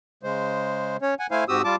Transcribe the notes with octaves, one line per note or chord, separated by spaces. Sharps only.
C#3 G#3 C5
C#4 C#5
F#5 G#5
A3 E4 C5 F5 G#5
G#2 C4 F#4 G4 D#6 E6
G3 F4 A5 D6